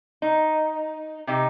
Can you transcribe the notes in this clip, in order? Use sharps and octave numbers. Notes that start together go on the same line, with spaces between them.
D#4
C3 D#4 G4